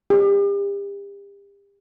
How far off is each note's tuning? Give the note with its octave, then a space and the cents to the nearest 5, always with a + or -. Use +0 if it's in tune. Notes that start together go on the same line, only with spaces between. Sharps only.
G4 +35